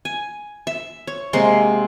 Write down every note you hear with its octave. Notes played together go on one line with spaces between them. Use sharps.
G#5
E5
C#5
C3 G#3 A#3 C6